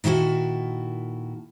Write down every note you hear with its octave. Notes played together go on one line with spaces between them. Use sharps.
A#2 D#3 E4 F#4 A4